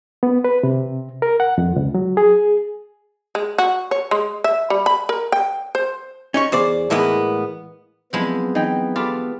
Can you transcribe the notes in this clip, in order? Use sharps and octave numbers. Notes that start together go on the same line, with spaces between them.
B3
B4
C3
A#4
F#5
F2
C#2
F#3
G#4
G#3
F#4
C#5
G#3
E5
G3
B5
A#4
G5
C5
C#4 D#4 C#5
E2 C5 D5
A2 E3 G#3 A#3 B3
F3 F#3 G#3 B3 C4 E4
E3 D#4 D#5 G5
F4 G4 A4 B5